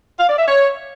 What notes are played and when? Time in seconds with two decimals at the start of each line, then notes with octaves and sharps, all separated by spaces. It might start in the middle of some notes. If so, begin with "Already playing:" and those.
0.20 F5
0.29 D5
0.39 E5
0.48 C#5